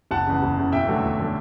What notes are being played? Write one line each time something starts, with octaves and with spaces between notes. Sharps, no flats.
F#1 F#5 A5
E2 C#3
F#1
E2 C#3
E1 E5 G5
E2 D3 F#3 A3
E1
D3 F#3 A3